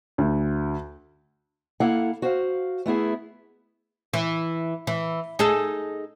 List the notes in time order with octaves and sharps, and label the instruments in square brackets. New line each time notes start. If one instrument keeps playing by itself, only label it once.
[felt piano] D2
[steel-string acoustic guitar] A#3 E4 A4 F5 F#5
F#4 C5 F5
A3 B3 E4 G#4
[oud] E3
E3
D#4 G#4 A4